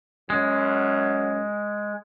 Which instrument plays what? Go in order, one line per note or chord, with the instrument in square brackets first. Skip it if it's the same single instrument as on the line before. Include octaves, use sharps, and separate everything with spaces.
[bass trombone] F#2 [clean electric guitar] G#3